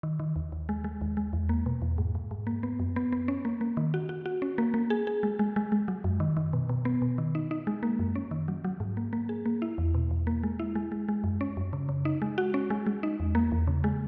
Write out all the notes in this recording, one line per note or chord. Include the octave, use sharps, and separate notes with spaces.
D#3
D#3
D#2
D#2
G#3
G#3
D#2
G#3
E2
A#3
B2
E2
G#2
G#2
G#2
A#3
B3
F#2
B3
B3
C#4
A#3
A#3
D#3
F#4
F#4
F#4
C#4
A#3
A#3
G#4
G#4
G#3
G#3
G#3
G#3
F#3
F#2
D#3
D#3
B2
B2
B3
B2
D#3
D#4
D#4
G#3
A#3
F#2
C#4
D#3
F#3
F#3
G#2
A#3
A#3
G#4
A#3
E4
E2
B2
E2
A#3
G#3
E4
G#3
G#3
G#3
F#2
C#4
F#2
C#3
C#3
D#4
G#3
F#4
C#4
G#3
G#3
D#4
E2
A#3
E2
C#3
G#3